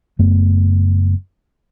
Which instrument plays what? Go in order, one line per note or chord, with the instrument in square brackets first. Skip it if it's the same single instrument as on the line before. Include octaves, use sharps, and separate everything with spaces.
[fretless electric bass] F#1 F#2 A3 B3